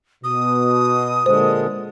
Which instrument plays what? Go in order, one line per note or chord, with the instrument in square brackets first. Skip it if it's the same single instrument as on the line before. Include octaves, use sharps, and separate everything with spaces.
[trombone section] B2 [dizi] D#6
[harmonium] A#2 D3 G#3 [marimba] C5